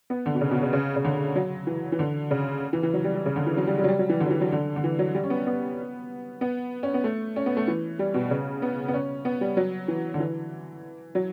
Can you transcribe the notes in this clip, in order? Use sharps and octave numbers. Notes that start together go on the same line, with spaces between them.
B3
D3
B2
C#3
B2
C#3
C#3
C#3
D3
F#3
E3
E3
D3
C#3
E3
E3
F#3
G3
G3
C#3
D3
E3
F#3
G3
G3
F#3
G3
F#3
E3
D3
F#3
E3
F#3
D3
D3
E3
F#3
G3
C#4
B3
B3
B3
C#4
B3
A3
C#4
B3
A3
E3
G3
B2
C#3
B3
B3
C#4
B3
G3
F#3
E3
D3
E3
F#3